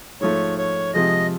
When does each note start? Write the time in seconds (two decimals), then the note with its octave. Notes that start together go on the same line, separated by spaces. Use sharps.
0.21 G#2 F3 A3 C#5
0.58 C#5
0.94 C3 F3 G#3 D#5